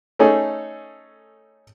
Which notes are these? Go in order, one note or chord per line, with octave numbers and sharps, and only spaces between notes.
A3 C#4 D#4 G#4 A4